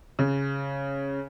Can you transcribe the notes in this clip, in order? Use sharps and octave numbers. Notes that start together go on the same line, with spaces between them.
C#3